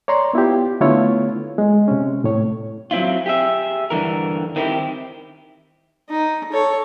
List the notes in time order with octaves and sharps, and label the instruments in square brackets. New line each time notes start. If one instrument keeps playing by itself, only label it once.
[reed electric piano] C#5 D5 A#5 C6
B3 E4 F4 G4
D3 A3 B3 E4 F4 C#5
G#3
C3 C#4
A2 C#5
[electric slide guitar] F#3 C4 E4 F4
G4 G#4 E5
G2 D3 E3 A#4
D#3 C4 E4 G4
[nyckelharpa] D#4
A4 C#5